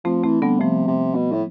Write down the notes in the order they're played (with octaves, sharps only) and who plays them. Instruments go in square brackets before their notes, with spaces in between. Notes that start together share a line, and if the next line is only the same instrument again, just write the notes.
[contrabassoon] F3 [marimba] A3 C4
[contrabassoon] E3 [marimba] A3 C4
[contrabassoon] D3 [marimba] G3 B3
[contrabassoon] C3 [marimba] F3 A3
[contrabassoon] C3
B2
A2